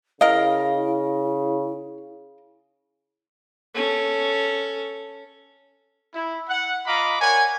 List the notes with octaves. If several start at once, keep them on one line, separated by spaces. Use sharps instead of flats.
C#3 E4 A#4 D#5 F5
C#4 A4
E4
F#5
F4 D#5 F5 A#5 B5 D6
A#4 C#5 D5 F#5 G#5